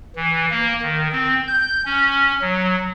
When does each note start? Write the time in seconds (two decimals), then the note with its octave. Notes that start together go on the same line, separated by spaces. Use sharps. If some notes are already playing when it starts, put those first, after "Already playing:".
0.16 E3
0.51 A#3
0.82 D#3
1.12 C4
1.47 G6
1.85 C#4
2.41 F#3